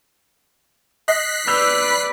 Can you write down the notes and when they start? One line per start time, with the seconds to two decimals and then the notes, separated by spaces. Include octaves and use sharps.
1.08 D#5 F#6 B6 C7
1.48 B4 D5 E6 G6 F7